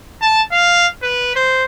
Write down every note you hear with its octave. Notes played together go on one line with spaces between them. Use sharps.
A5
F5
B4
C5